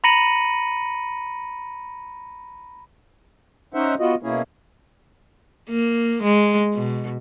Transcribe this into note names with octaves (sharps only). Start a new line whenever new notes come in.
A#5 B5 A#6 C#7 D#7 F#7
C#4 D#4 C5 E5 F#5
B3 F4 F#4 D#5
B2 A#3 C#4 E4 G#4
A#3
G#3
B2